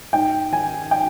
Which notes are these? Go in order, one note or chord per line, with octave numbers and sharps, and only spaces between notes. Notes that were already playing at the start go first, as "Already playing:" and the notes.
G#2 G5
D#3 G#5
G5